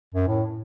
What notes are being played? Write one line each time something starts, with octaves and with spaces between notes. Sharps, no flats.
F#2
A2